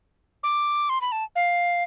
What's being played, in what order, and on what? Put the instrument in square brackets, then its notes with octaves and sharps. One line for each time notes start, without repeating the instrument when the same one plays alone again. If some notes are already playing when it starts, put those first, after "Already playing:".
[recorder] D6
C6
B5
A5
F5